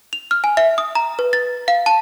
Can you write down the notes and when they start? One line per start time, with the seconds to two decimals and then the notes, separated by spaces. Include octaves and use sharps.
0.13 F7
0.31 F6
0.44 G#5
0.57 E5
0.78 D#6
0.95 A#5
1.19 B4
1.33 A6
1.68 F5
1.86 A5